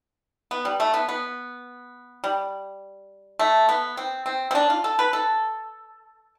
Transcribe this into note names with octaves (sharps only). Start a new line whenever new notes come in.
B3
G3
A3
B3
B3
G3
A3
B3
C4
C4
C4
D4
F4
A4
B4
A4